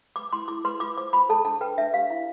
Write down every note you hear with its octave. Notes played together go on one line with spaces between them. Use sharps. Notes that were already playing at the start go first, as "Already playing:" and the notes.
B4 D6
E4 C6
E4 D6
B4 C6
F4 D6
C5 D6
F4 B5
A4 A5
D4 A5
B4 G5
D4 E5
G4 F5
E4